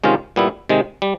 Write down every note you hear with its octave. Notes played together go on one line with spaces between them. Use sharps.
C3 D#3 G#3 C#4 F4
A#2 G3 B3 E4
C3 D#3 G#3
G3